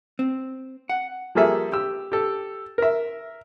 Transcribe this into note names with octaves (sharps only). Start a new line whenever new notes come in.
C4
F#5
F3 G3 A#3 G#4 A4 E5
G4 E6
G4 A4
A#4 E5